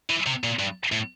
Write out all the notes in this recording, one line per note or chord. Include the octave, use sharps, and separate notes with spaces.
E3
C3
A#2
G2
A2